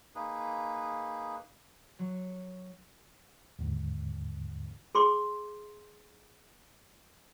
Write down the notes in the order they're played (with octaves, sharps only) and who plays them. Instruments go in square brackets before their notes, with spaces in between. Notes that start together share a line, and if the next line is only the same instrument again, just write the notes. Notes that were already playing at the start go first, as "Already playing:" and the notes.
[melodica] A#3 D#4 G#4 B4
[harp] F#3 C#6
[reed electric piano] D#2 G#2 D3
[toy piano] G#4 C6 D6